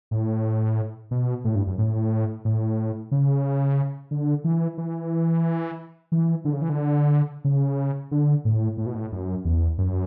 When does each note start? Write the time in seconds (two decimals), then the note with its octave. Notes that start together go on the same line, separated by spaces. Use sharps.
0.11 A2
1.11 B2
1.45 A2
1.55 G2
1.67 F#2
1.78 A2
2.45 A2
3.12 C#3
4.11 D3
4.44 E3
4.78 E3
6.12 E3
6.45 D3
6.53 C#3
6.62 E3
6.69 D3
7.45 C#3
8.11 D3
8.45 A2
8.77 A2
8.86 B2
8.95 A2
9.12 F#2
9.45 E2
9.78 F#2